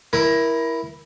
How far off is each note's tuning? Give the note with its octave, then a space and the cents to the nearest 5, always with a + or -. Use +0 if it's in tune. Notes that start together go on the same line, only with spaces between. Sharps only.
E4 +0 A#4 +20